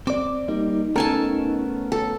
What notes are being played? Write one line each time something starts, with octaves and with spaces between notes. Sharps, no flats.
C4 D5 D6
G3 A#3 D#4
A3 B3 C#4 A4 A#4 G#5 A5
A4